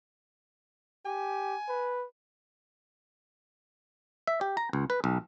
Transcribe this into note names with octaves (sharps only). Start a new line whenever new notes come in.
G4 G#5
B4
E5
G4
A#5
C#2
B4
B1